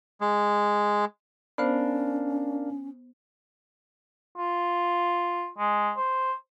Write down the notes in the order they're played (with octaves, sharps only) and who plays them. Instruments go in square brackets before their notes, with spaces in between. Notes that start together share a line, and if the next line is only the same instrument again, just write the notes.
[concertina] G#3
[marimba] B3 C5 [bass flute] C#4 [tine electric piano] D4 A#4 F5
[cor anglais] F4
G#3
C5